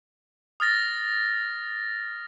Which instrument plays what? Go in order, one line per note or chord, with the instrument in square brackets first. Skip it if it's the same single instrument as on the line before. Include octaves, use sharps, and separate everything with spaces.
[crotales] D#6 F6 A6 A#6